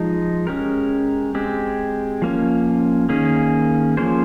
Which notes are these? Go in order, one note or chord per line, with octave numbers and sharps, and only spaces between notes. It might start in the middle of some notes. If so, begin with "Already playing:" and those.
Already playing: F3 G#3 D#4
G#3 C#4 G4 A#4
G#3 C4 G4
F3 A#3 C#4
D#3 A#3 C#4 G#4
F3 A#3 C#4 G#4 C5